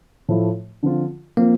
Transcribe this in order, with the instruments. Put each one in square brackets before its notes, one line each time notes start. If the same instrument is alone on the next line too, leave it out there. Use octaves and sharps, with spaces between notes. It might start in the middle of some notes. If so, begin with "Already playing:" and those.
[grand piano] A2 F3 A3 E4
D3 F3 C4 F4
[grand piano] F3 C4 F4 A#4 [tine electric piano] A#3